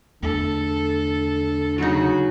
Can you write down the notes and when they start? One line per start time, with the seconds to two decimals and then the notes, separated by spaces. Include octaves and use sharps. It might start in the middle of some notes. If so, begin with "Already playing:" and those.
0.23 E2 D3 A3 A4
1.78 C#3 F#3 D#4 F#4